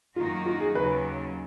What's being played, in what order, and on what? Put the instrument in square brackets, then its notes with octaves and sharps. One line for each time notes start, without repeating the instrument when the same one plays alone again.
[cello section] F#2 D#3 A#3 D#4 F#4 [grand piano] F4
[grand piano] F4
G#4
[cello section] D#2 C#3 F#3 [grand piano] B4